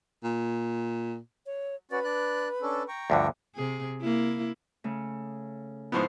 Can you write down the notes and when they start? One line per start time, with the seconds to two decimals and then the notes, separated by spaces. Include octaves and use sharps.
0.24 A#2
1.46 C#5
1.91 C#4 F#4 B4 D5
2.04 D4 D5 F#6
2.62 C#4 D4 A4
2.88 G5 A#5 C#6
3.10 D2 G2 D3 F3
3.55 C3 G#4
4.01 A#3 E4
4.84 C#3 A3
5.92 G#2 F3 B3 E4 C5 C6